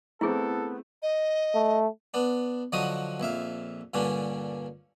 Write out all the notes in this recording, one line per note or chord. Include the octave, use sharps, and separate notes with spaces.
A3 B3 C4 E4 G#4 A4
D#5
A3
B3 D4
D3 F3 F#3 F#4 D#5 D#6
A#1 F2 E5 F5
G2 A#2 D3 C#4 D4